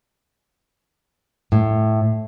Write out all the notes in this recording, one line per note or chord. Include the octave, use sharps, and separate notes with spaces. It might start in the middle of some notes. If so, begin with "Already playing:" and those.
A2